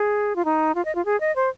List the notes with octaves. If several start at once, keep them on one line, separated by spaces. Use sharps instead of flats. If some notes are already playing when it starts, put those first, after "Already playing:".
Already playing: G#4
F4
D#4
F4
D#5
F4
G#4
D#5
C5